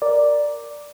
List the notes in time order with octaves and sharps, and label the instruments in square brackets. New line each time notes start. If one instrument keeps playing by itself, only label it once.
[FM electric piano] A#4 D5